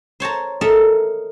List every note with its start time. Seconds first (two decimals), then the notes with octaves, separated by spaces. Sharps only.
0.20 C5 C#5 A5 A#5
0.61 A4 A#4 D#5 E5 A#5